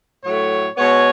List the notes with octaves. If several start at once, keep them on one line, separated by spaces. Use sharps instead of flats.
A2 F#3 A3 C#5
B2 G#3 B3 C#5